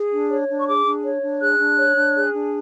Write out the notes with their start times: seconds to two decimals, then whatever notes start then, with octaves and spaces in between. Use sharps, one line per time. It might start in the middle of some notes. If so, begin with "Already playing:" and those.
Already playing: G#4
0.12 D4
0.30 C#5
0.48 D4
0.59 C#6
0.66 G#4 D6
0.86 D4
1.04 C#5
1.22 D4
1.41 G#4 F#6
1.59 D4
1.78 C#5
1.96 D4
2.16 G#4
2.34 D4